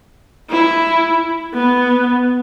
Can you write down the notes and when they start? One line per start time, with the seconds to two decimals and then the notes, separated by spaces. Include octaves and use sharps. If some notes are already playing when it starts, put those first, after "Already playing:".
0.50 E4
1.54 B3